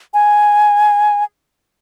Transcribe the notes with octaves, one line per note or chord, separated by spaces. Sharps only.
G#5